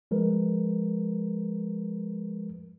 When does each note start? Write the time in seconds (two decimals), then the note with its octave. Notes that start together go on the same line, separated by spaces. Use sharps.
0.11 F3 G#3 A#4 B4